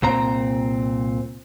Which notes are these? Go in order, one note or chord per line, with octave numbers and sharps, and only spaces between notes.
C2 A#2 C4 A#5